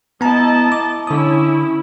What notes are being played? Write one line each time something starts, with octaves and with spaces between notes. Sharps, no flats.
B3 E4 D#5 A5 A#5
D6
D3 C#4 E4 D#6